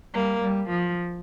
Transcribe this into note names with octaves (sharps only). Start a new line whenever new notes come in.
G3 A#3
G3
F3